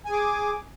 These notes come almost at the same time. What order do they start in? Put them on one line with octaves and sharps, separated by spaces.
G#5 G#4 D6